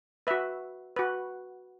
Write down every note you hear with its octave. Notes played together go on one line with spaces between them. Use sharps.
F#4 B4 E5
F#4 B4